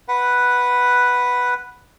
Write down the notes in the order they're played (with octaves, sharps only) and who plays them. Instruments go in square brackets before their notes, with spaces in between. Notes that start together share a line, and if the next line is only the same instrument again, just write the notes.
[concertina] B4 F#5